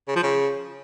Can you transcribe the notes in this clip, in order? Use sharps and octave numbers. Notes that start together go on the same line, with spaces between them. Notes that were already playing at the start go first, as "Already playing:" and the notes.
C#3
F3
C#3